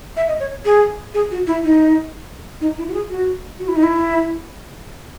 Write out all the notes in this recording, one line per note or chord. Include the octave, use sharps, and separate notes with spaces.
E5
D#5
C#5
G#4
G#4
F#4
E4
D#4
D#4
E4
F#4
G#4
F#4
F#4
E4
D#4
E4